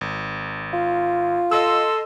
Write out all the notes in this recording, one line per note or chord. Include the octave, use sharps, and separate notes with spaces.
G#1
F4
A4 D#5 C6 E6